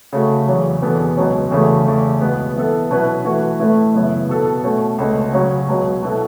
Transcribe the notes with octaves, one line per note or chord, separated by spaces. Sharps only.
C#3 A3 F#4
E2 C#3 F#3
E2 B2 B3 A4
C#2 B2 F#3 C#4
E2 C#3 A3 F#4
E2 C#3 A3
C#2 B2 B3
E3 B3 A4
B2 F#3 C#4 E4 B4
E3 A3 F#4 B4
A2 A3 E4 B4
F#2 C#3 E3 B3 E4
B2 B3 A4
B2 A3 C#4
C#2 B2 A3 C#4
C#3 F#3 C#4 F#4
C#2 B2 F#3
B2 B3 E4 A4